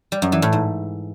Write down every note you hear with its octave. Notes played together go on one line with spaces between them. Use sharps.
G3
F#2
E3
A2
G#2